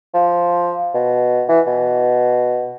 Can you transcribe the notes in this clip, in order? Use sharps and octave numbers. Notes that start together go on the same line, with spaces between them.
F3
B2
E3
B2